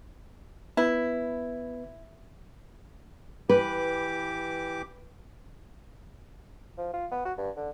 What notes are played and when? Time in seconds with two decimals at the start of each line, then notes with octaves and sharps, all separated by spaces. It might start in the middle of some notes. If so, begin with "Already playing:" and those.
0.77 B3 E4 B4
3.49 E3 G4 B4 D6
6.78 F3
6.93 F4
7.12 B3
7.25 F#4
7.38 G2
7.56 D3